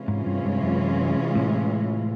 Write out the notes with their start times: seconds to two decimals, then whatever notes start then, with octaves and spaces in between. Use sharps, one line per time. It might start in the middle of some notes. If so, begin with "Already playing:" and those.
Already playing: C3 E3 G#3 C#4 F4
0.08 G#2
0.26 G2
0.45 G2
0.63 F#2
1.35 A2